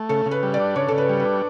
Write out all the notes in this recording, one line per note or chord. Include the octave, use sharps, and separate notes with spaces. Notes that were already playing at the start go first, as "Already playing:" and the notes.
Already playing: A3
C#3 A4
C#3
B4
G3
D5
D4
C#3 C#5
C#3 A4
B4
G3
B4
D4